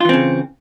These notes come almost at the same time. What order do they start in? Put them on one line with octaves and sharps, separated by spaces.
F4 E3 C4 C#3